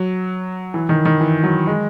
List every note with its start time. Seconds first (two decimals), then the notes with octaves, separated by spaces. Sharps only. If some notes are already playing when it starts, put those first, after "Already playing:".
Already playing: F#3
0.74 E3
0.89 D#3
1.05 D#3
1.21 E3
1.44 F#3
1.67 G#3